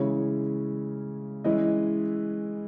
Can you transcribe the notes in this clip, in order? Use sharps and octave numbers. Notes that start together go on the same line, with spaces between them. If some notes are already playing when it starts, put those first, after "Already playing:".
Already playing: C#3 E3 G#3 C#4 E4 C#5
E3 G#3 C#4 E4 D#5